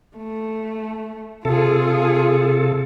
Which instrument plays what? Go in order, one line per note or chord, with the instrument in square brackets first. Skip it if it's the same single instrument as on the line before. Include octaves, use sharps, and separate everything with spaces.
[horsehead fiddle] A3
[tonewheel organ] C3 A4 [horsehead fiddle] F4 G#4